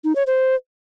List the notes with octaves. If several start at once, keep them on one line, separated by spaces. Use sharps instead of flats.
D#4
C#5
C5